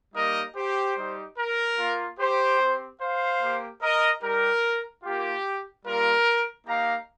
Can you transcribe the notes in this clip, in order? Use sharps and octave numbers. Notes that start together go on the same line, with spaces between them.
G3 A#3 D#4 G4 A#4 D#5
G4 C5
G3 D#4 G4
A#4
A#3 F4
G4 C5
C4 G4
C5 F5
A#3 G4
A#4 D#5
G3 D#4 G4 A#4
A#3 F4 G4
G3 A#3 F4 A#4
A#3 D#4 G4 F5 A#5